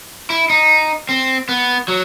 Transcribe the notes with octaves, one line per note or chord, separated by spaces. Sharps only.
E4
D#4
C4
B3
F#3